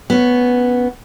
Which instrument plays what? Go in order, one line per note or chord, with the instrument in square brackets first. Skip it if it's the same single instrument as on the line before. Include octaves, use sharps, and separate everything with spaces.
[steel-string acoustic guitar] B3 C#4